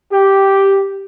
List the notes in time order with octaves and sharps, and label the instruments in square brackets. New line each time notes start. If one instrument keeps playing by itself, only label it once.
[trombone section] G4